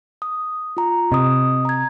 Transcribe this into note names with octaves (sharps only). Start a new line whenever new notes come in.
D#6
F4 A#5
C3 D#5 D#6
A#5 G#6